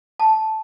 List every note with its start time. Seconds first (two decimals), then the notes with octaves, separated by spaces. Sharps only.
0.20 A5